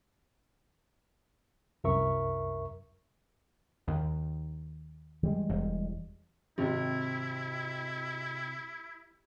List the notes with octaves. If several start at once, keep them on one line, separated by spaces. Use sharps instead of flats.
C2 F#2 A#4 E5 C#6
D#2
E3 G3 G#3
E1
G#1 C3 E4